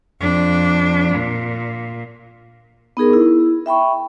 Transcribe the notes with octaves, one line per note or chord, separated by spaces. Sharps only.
F2 D4
A#2
B3 D#4 G#4 A#4
E4
E5 G5 B5 C#6